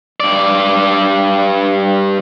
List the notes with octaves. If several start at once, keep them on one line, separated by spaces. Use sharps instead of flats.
G2 D5